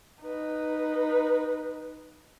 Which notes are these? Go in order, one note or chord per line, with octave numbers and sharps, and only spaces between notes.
D#4 B4